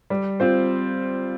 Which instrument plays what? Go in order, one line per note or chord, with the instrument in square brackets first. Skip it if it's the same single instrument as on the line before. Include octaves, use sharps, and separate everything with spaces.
[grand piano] G3
C4 F4 C5